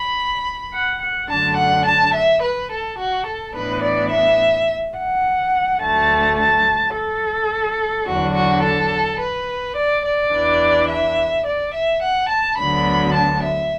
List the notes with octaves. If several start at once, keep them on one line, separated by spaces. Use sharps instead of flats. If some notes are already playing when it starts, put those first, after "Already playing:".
Already playing: B5
F#5
F#5
F#2 D3 A3 D4 A5
F#5
A5
E5
B4
A4
F#4
A4
A2 E3 B3 D4 B4
D5
E5
F#5
D2 D3 A3 A5
A5
A4
E2 D3 F#3 D4 F#4
F#4
A4
B4
D5
D5
E2 E3 D4
E5
D5
E5
F#5
A5
D2 D3 F#3 B3 D4 B5
A5
E5